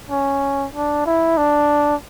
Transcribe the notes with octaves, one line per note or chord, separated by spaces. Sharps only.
C#4
D4
E4
D4